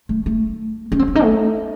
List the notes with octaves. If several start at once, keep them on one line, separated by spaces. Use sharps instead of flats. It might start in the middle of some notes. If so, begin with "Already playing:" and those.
A3
A3
C#4
C4
C#4
D#4
A3